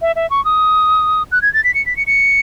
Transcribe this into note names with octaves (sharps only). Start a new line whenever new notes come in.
E5
E5
C#6
D#6
F#6
G#6
A6
B6
C#7
B6
C#7
C#7